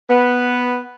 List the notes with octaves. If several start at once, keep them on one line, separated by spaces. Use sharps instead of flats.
B3